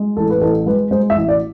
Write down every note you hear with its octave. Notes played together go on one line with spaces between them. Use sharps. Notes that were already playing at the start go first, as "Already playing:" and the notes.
Already playing: G#3
A1 A4
B4
A1 A4
G#3 B4
G#3 C5
E5
A1
D5